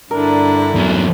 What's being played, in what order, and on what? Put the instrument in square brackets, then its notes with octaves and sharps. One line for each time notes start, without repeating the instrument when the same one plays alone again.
[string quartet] G2 D3 E4 [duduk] D4 [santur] A#4
[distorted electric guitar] E2 F#3